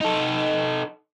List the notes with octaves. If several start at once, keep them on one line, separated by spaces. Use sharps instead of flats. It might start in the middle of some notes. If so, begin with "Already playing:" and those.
D#4 A4